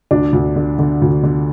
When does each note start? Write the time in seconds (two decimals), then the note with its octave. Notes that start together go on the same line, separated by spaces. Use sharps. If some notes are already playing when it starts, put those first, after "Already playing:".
0.11 D2 D4
0.33 D2
0.56 D3
0.79 D3
1.02 D2
1.23 D3